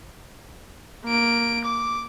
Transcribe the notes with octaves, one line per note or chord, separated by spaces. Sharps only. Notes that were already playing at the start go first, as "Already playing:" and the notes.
A#3 D7
D6